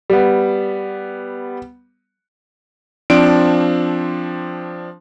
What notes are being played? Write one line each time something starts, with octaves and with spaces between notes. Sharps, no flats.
G3 B3
F3 C4 D4 D7